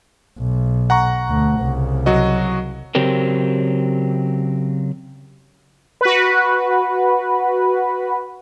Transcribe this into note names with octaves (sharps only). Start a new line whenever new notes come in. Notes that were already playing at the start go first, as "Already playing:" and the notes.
B1
F#5 A#5 C#6
D2
C2 C#3
F#3 F#4 D#5
C#3 F#3 C4 G4 A#4
F#4 B4